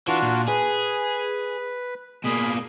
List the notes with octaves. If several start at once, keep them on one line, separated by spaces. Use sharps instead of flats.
E3 D4 F4 F#4
A#2
G#4 B4
B2 A#3 G#4 B5